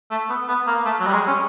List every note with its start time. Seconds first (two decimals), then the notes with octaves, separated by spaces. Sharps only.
0.11 A3
0.30 B3
0.48 B3
0.67 A#3
0.85 A3
0.99 F#3
1.07 G3
1.13 G#3
1.27 C#4